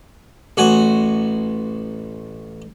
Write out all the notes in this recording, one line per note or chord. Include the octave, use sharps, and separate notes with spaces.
A1 F#4 G#5